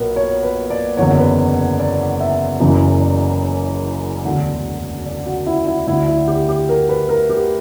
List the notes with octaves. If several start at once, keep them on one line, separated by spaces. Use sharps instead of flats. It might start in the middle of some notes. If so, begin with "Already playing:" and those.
Already playing: B1 A#2 A#4 B4
C#5
B4
D5
F#1 E2 D3 C#5
B4
D5
E5
F#1 F#2 C#3 E3
D5
E1 D2 D3
D5
F#4
E4
E4
D2 D3 E4
E4
G4
G4
A#4
B4
A#4
G4